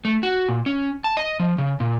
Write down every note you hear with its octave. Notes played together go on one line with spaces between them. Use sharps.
A3
F#4
A#2
C#4
A5
D#5
F3
C#3
A#2